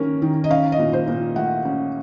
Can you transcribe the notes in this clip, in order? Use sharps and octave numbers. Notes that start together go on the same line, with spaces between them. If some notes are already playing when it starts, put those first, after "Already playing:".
Already playing: D#3 A#3 C#4
D#3
D#5
C#4 F5
D#5
A#2
C5
A#2
A3 F#5
C#4